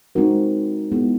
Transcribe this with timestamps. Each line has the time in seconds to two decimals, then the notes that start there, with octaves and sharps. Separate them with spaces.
0.15 G#3 C4 D#4 F#4 A#4
0.92 G#3 B3 E4 G#4